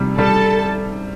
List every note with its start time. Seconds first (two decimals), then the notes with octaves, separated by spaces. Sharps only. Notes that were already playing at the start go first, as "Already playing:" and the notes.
Already playing: C3 G3
0.18 G3 A4 A5